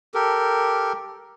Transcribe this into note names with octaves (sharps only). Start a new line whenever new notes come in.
G4 A4 A#4